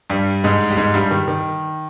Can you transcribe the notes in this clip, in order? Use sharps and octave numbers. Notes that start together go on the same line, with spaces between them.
G2 G3
G#2 G#3
G3
G#2 G#3
G2 G3
D#3
D#3